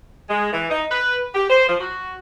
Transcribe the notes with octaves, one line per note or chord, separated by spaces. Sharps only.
G#3
E3
D#4
B4
G4
C5
F3
F#4